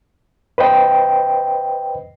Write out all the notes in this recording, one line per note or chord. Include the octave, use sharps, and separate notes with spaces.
B4 C5 D#5 G5